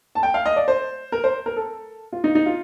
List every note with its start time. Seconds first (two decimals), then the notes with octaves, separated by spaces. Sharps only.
0.15 A5
0.23 G5
0.34 F5
0.46 D#5
0.56 D5
0.68 C5
1.12 A#4
1.24 C5
1.46 A#4
1.56 A4
2.12 F4
2.24 D#4
2.35 D#4
2.46 F4